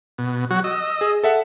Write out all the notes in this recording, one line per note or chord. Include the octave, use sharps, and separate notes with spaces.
B2
F#3 F#4
D#5 E6
G#4
A4 E5 F#5